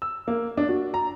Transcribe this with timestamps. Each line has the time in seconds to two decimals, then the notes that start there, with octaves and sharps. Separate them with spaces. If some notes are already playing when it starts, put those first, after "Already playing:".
0.02 E6
0.28 A#3
0.57 D4
0.69 F#4
0.94 A#5